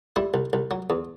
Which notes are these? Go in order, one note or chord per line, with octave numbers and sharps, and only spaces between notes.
G3 E4
C2
C2
F#3
E2